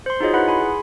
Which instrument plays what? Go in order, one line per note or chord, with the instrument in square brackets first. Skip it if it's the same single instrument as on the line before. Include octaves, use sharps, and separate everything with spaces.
[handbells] C5 C6
D#4 F4 F#4 G#4 C#5 D#5
E4 B4 F#5 B5
G#5 B5 C6
G#4